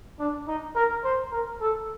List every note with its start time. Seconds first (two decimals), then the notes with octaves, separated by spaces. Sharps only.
0.20 D4
0.47 D#4
0.75 A#4
1.04 C5
1.32 A#4
1.61 A4